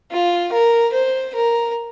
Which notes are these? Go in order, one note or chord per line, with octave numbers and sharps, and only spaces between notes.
F4
A#4
C5
A#4